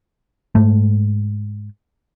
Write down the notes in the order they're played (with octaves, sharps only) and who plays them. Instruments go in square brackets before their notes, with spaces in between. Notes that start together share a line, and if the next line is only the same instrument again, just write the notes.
[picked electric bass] G#2 A3